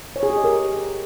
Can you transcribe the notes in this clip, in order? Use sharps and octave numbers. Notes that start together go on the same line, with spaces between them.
C#5
G#4
G4
D#5
A#4